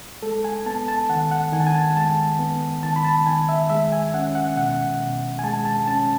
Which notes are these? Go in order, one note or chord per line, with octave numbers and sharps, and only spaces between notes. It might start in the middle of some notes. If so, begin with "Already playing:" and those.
G#3 A4
G#5
B3 A5
A5
D#3 F#5
F#5
D#3 G#5
A5
G#5
A5
G#3 A5
B3
D#3 A5
B5
A5
D#3 G#5
E5
G#3 E5
G#5
C#4 F#5
F#5
B2 F#5
B2
G#5
G#3 A5
A5
C#4 A5